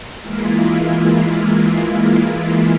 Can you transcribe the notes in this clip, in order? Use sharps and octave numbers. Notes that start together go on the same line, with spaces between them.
E3 G#3 A#3 E4 F4